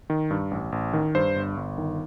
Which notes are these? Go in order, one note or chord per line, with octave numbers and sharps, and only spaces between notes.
D#3
G2
A1
A1
D#3
G2 C5
G1
G1
D#3